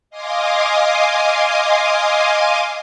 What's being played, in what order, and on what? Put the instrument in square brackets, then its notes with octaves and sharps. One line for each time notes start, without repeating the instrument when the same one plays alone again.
[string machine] D#5 F5 G#5 C6 D6 D#6